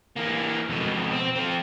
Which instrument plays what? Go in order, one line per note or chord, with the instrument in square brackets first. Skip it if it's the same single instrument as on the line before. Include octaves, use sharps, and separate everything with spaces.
[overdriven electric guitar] E3 A#3
F2 B2
C4
F3 C4